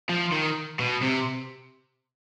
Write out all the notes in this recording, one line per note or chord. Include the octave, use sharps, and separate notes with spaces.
F3
D#3
B2
C3